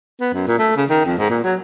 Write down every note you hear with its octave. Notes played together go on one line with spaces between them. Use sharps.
B3
F#2
A#2
A3
C#3
D#3
F2
G#2
A#2
F#3